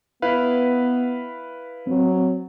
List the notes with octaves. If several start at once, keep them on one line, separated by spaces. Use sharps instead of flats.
B3 E4 B4 F5
F#3 C4